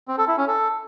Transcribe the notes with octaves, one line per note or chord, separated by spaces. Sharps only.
C4
A4
E4
C#4
A4